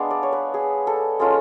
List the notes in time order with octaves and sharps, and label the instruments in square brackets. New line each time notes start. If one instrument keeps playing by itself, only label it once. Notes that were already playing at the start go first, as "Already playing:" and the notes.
Already playing: [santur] G#3 B3 D4 F5
D5
C#5
B4
G#4
A4
G#3 C#4 F4 A4